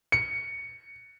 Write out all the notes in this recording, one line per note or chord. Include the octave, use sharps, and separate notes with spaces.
C#7